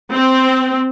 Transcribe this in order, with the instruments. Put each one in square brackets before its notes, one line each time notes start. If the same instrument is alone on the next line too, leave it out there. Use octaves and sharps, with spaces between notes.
[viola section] C4